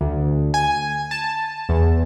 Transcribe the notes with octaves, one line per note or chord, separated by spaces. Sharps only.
D2
G#5
A5
E2